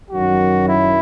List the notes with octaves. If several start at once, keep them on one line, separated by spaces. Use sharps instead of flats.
F#2 D#3 F#3 F#4
E4